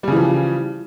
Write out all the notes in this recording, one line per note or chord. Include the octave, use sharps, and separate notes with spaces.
C#3 E3 F3 G3